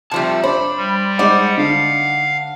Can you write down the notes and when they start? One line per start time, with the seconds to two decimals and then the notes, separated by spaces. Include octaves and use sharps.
0.11 C3 F3 G3 E5 A5
0.44 D4 C5 B5
0.77 G3
1.19 G#3 D#4 C5 D5 F#5
1.57 D3 F5